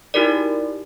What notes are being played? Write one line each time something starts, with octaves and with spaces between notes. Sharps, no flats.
D#4 E4 F#4 G4 A#4 D5